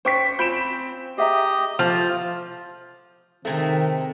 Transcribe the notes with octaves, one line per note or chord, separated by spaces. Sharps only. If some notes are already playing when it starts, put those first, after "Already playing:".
C#4 C5 G5 C#6 B6
C4 F4 G#5 B5 G6 D7 E7
G4 G#4 D#5 E5 A#5
F3 A3
C3 D#3 G#3 A3 C4